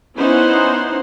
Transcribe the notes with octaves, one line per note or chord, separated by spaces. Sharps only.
B3 C#4 D#4 E4 C5 F#5